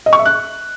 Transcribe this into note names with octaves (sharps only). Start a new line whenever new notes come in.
D#5
C#6
E5
F#6